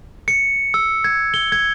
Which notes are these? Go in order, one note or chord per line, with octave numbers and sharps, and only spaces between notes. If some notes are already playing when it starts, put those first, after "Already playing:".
C#7
E6
G#6
G7
G#6